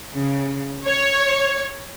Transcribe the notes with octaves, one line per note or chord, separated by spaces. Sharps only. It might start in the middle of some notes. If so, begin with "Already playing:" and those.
C#3
C#5